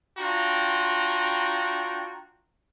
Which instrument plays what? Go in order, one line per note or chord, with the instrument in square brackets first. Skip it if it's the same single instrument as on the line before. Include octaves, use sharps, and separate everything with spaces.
[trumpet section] D4 F4 F#4 G5 A#5